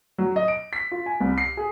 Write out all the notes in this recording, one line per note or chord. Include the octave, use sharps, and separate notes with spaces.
F#3
D#5
D7
B6
F4
G#5
C2
C7
G#4